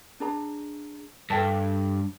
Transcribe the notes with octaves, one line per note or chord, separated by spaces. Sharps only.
D4 G#4 A#5
G2 A4 G5 A5